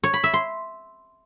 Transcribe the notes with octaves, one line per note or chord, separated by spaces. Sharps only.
C#5
B5
E5
C6